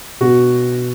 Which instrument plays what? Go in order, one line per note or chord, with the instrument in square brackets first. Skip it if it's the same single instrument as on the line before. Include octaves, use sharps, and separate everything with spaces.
[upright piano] B2 F#4